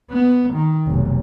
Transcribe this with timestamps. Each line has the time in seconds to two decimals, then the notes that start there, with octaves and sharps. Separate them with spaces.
0.11 B3
0.54 D#3
0.87 F1 B1